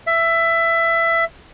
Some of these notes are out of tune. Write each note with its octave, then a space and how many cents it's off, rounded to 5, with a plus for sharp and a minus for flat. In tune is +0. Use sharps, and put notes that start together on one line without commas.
E5 +15